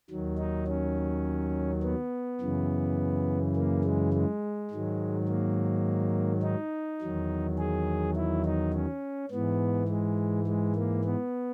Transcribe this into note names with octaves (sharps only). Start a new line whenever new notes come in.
D#2 D#3 F#3
D#4
C#4
B3
F#2 C#3 E3
A#3
G#3
G#3
G#2 D#3 F#3
A#3
D#4
E2 D#3 F#3
G#4
E4
D#4
C#4
G#2 E3 B3
G#3
G#3
A#3
B3